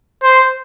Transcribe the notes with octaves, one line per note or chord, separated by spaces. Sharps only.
C5